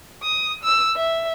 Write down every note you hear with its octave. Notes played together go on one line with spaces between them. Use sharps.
D#6
E6
E5